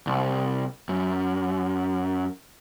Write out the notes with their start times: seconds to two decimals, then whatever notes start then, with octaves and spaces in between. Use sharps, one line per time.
0.07 C2
0.89 F#2